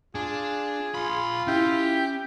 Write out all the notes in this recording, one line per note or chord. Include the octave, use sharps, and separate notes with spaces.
D4 F4 G#4
F4 B5 C6
C#4 E4 G4